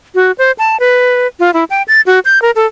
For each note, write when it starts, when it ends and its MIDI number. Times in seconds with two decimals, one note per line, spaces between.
0.15 0.32 66
0.38 0.51 72
0.59 0.77 81
0.80 1.27 71
1.40 1.53 65
1.54 1.64 64
1.70 1.82 79
1.88 2.01 93
2.06 2.19 66
2.25 2.41 91
2.42 2.51 70
2.56 2.66 69